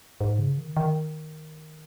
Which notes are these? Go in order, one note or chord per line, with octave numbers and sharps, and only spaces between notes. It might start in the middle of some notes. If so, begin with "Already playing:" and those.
G#2
C#3
D#3
D#3